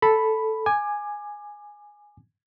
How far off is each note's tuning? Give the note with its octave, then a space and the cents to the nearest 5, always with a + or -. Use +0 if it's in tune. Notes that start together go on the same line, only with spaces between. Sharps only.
A4 +0 B5 +0
G#5 +0 D6 +25